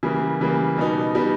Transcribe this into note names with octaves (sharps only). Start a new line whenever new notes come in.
C#3 E3 G3 A#3
C#3 E3 G3 A#3
B2 G3 B3 D#4
B2 G3 B3 D#4